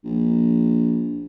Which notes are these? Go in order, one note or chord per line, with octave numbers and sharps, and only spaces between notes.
A#1